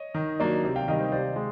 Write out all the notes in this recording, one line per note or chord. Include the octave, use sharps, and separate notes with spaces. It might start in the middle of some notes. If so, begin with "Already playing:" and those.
Already playing: C#5 D#5
D#3
F#3 A#3 D4
C3
F5 G5
D#3 G3 D#5 F5
C5
C3 C5 D5
G#3